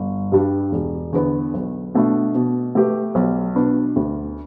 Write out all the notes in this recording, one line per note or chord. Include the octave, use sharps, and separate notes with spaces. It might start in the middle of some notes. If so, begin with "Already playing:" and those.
Already playing: G1
G2 G3 D4
E1
E2 D3 B3
B1
B2 A3 D4
B2
A3 G4 B4
B1
B2 B3 D4
D2